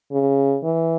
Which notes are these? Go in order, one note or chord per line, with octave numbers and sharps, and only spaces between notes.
C#3
E3